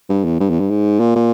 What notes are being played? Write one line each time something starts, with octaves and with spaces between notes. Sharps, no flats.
G2
E2
G2
E2
G2
G#2
A#2
A#2